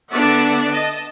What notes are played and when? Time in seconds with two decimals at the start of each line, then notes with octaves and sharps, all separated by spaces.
0.11 D3 B3 D4 D5 E5 F#5
0.72 D#5 A5